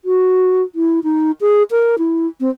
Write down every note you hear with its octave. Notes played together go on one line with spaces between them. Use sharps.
F#4
E4
D#4
G#4
A#4
E4
C4